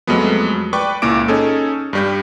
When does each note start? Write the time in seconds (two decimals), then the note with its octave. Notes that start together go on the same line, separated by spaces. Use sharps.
0.07 F2 F#3 G#3 A3 B3
0.73 B4 D5 G5 C#6 D6
1.02 C#2 A#2 A#3 E4 D6 D7
1.28 C#4 D#4 G#4 A4
1.93 G2 G3 G6